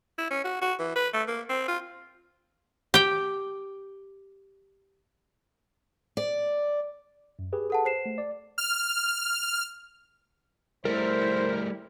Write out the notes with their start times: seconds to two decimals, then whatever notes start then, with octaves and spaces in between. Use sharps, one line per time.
0.18 E4
0.31 C#4
0.44 F#4
0.62 F#4
0.79 E3
0.96 B4
1.14 A3
1.28 A#3
1.50 C4
1.68 F4
2.94 G4 G5
6.17 D5
7.39 F#2
7.53 G4 G#4 B4
7.70 A4 F#5 A5
7.85 C5 C7 E7
8.06 A3
8.18 D5
8.58 F6
10.85 G3 A3 E4 A#4 C5